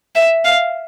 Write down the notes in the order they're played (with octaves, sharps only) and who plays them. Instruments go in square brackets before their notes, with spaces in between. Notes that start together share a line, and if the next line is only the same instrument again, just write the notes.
[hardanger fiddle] E5
F5